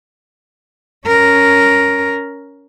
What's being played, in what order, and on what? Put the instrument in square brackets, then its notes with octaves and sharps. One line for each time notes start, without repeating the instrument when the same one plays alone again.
[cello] C#4 A#4